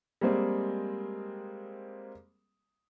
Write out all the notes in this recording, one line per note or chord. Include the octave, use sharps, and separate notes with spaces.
G3 G#3 A#3 C4 G#4